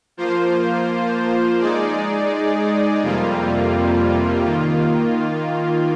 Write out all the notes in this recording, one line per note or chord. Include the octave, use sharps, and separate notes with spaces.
F3 A#3 F4 C5
G#3 D#4 G#4 D5
F2 C3 G3 A#3 F4
D#3 A#3 F4